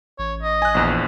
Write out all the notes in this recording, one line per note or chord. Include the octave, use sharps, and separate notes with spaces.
A1 C#5
D#5
G#5 F#6
A#1 E2